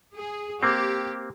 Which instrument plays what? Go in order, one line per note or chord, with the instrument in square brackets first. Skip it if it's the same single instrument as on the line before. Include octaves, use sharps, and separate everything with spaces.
[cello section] G#4
[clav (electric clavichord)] A#3 C4 [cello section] G4